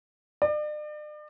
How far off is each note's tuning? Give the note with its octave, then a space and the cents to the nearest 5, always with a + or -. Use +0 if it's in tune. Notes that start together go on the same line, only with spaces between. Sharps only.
D5 +40